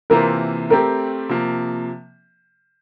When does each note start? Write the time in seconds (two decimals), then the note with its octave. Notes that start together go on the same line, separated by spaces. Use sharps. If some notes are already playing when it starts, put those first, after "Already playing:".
0.10 C3 E3 A#3 F4 A#4 C5
0.70 A3 C4 G4 A#4
1.29 C3 F3 A#3